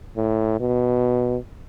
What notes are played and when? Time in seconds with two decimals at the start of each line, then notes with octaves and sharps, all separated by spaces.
0.17 A2
0.60 B2